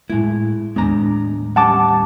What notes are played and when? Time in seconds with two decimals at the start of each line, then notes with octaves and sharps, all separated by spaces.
0.10 A2 G#3 A3 E4
0.76 D#2 A2 G#3 B3 D4 A#5
1.56 G3 C#4 F#5 A5 D6